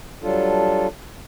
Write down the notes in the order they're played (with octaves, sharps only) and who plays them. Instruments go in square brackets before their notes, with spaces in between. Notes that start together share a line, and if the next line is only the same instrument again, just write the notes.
[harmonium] F#3 G3 D4 F4 A4